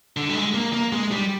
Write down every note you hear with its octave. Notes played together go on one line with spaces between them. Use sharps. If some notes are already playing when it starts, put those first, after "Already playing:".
D3
G3
G#3
A#3
A#3
G#3
G3